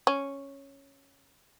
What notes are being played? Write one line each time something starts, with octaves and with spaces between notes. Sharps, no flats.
C#4